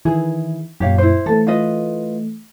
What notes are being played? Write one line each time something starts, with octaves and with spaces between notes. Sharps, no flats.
D#3 E3 E4 G#4
F#2 A#2 G4 C#5 F5
E4 C5
E3 A3 A4
F4 B4 D#5